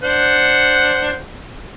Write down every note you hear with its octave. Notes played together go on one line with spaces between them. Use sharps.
D4 C5 F#5